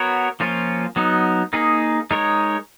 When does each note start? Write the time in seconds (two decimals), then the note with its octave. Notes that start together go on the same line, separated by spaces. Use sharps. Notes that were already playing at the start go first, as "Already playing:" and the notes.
Already playing: B3 F#4 A#4 C#5
0.40 F3 A#3 C#4 F4
0.96 F#3 B3 D#4
1.53 A#3 D#4 G#4
2.11 G#3 D#4 A#4 C#5